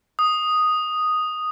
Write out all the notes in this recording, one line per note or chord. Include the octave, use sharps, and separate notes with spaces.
D#6